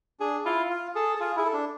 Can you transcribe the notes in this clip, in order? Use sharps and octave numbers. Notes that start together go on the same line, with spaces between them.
D4 G#4
E4 F4
F4
G#4 A4
A4
F4 G#4
E4 G#4
A4
D4